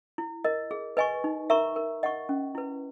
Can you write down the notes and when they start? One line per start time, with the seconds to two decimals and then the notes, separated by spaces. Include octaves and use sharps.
0.18 E4
0.44 A#4 D#5
0.71 G#4
0.97 B4 D#5 G#5 C#6
1.24 D#4
1.50 A#4 E5 A#5 C#6
1.76 A#4
2.03 D#5 F#5 C#6
2.29 C#4
2.55 E4 B4